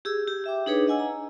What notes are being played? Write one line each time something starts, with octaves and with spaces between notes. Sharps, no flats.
G4 G#4 E6
G4
G4 E5 G5 D6
D4 D#4 G#4 B4 C#5
D4 D#5 F#5 G#5 E6
A#5